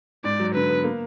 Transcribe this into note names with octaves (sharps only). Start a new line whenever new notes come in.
G#2 D5
F#3
D3 B4
B3
A#3